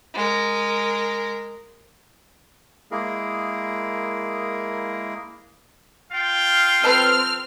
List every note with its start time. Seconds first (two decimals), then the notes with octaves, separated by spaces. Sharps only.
0.14 G#3 A#4
2.91 G#3 A#3 E4 G#4 A#4
6.12 F4 F5 G5
6.84 F3 C4 A4 B4 F6